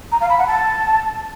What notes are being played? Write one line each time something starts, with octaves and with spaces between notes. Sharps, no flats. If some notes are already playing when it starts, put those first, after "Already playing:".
A#5
F5
B5
F#5
A5